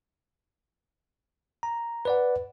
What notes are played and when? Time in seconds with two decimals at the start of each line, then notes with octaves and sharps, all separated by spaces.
1.63 A#5
2.05 B4 D5 F#5